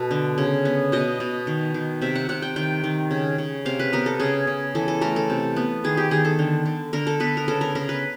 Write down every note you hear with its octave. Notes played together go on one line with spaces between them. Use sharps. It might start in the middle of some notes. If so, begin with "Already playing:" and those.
Already playing: B2 A4
D3
C#3
B3
B2 D#5
B2
D#3
D#3
C3 E5
F#5
C3 F#5
G5
D#3 G5
D#3
C#3
C#3
C3 F5
B4
B3 A#4
A4
C#3 G#4
C#3
E3 A4
A4
A3 A#4
A4
C3
B3
D#3 G#4
G4
D#3 G#4
A4
D3
D3
D3 A#4
A4
B3 B4
A#4
C#3 A4
A#4
C#3 A#4
B4